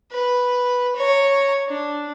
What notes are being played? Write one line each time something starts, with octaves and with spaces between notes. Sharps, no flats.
B4
C#5 A#5
D4